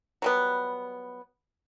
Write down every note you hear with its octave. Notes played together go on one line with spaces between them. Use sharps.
F#3 G3 B3